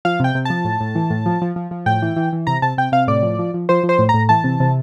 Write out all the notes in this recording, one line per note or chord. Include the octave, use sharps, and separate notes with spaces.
F3 F5
C3 G5
C3
F3 A5
A2
A2
E3
A2
F3
F3
F3
F3
A2 G5
E3
E3
E3
C3 A#5
C3 A5
C3 G5
C3 F5
A2 D5
F3
F3
F3
F3 C5
F3
C5
A2
A2 A#5
E3 A5
C3
C3